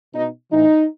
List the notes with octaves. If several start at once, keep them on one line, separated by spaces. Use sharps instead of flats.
B2 D#4
A2 E3 D#4